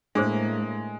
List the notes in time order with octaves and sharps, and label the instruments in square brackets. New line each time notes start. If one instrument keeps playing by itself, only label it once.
[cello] A2 A#3 [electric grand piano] G#3 [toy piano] D4 G#4 C5